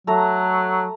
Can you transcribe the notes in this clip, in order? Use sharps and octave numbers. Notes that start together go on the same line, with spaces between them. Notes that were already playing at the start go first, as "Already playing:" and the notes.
F#3 A3 A#5